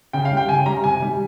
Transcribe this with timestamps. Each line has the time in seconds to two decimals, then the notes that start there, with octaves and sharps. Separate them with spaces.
0.13 C#3 G5
0.25 F5
0.31 G3
0.37 G5
0.49 C#3 G#5
0.66 G3 A#5
0.84 C3 G#5
1.01 D#3 G3